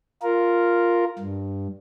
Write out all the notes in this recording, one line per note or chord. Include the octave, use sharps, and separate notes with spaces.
F4 A#4
G2